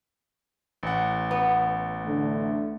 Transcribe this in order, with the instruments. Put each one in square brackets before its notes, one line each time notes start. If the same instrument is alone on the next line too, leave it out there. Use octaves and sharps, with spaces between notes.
[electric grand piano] A1 F#5
[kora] B3
[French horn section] D3 A3